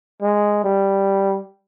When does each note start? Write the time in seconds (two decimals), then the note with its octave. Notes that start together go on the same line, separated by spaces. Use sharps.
0.22 G#3
0.64 G3